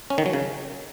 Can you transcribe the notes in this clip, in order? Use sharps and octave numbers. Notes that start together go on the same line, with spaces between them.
C#4
D#3
F#3
C#3